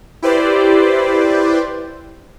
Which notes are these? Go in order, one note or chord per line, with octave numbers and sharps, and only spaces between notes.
E4 G4 B4 C5 D5